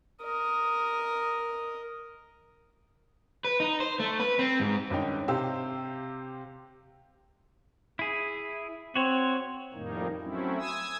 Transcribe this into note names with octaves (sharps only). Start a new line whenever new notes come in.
A#4 D#5
B4
D#4
C5
A3
B4
C4
G#2
G#1 G2 C#4 D#4 G5
C3 G4 C5 F5 E6
E4 G#4
C4 F#4 C#5
F2 A2 D#3 G3 A#3 D#4
F#3 A3 C4 C#4 E4
G#5 D#6 E6